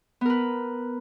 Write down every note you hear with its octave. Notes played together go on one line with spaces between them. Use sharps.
B3 A#4 B4